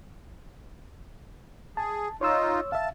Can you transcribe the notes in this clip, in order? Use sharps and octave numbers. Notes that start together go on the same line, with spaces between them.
G#4 A5
D#4 F4 C#5 C6 E6
E5 F5 A5